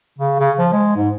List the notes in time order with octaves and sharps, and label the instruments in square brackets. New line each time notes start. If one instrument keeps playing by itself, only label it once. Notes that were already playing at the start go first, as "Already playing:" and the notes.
[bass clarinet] C#3
C#3
F3
G#3
G#2